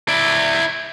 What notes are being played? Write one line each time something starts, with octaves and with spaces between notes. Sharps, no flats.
E4 D5